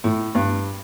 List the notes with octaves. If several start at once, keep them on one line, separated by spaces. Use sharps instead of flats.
A2
G2